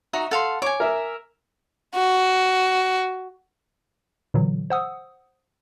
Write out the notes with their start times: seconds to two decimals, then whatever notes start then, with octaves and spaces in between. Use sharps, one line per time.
0.13 D#4 F#4 E5 A#5
0.31 A4 F5 F#5 C6
0.62 C#5 G#5 D6
0.80 A#4 E5
1.95 F#4
4.34 A#2 D3 E3 F#3
4.70 C5 F#5 D#6 E6